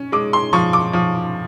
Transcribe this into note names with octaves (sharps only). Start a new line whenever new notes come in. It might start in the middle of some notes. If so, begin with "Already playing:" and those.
Already playing: C#4
G#3 D6
C6
F3 C#6
D6
F3